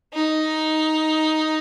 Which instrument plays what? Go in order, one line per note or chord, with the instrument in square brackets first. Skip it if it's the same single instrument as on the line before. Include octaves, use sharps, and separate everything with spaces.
[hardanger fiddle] D#4